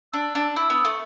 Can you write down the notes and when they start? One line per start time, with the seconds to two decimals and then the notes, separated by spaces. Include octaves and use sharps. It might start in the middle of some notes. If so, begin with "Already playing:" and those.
0.13 D4 E6
0.35 D4
0.56 E4 E6
0.70 B3
0.85 A3